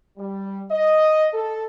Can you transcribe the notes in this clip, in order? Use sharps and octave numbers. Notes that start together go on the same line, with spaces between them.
G3
D#5
A4